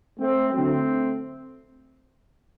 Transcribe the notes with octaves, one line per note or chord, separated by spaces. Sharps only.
A3 C4
D2 D3 F#3 A3 C4